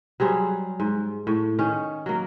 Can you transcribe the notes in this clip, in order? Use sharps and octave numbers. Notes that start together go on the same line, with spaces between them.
F#3 G3 G#4 C5
G#2
A2
D#3 C#4
F#3 A#3